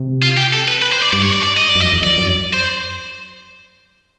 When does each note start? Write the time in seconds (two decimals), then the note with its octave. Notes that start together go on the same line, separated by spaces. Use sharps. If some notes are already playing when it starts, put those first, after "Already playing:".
Already playing: C3
0.22 F4
0.37 G4
0.53 A4
0.68 B4
0.82 B4
0.92 C5
1.02 D5
1.13 G2 D5
1.22 C#5
1.33 D5
1.43 D5
1.57 D#5
1.69 D5
1.75 F#2
1.81 F2 D#5
1.93 E2
2.02 F2 D5
2.18 F#2
2.53 C5